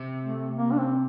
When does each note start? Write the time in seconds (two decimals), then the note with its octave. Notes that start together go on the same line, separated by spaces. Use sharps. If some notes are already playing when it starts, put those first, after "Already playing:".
Already playing: C3
0.23 A3
0.56 A#3
0.71 D4
0.78 C4